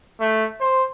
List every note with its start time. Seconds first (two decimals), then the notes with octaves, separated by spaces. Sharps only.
0.20 A3
0.61 C5